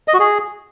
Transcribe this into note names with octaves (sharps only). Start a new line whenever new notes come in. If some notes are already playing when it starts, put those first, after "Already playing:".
D#5
F#4
G#4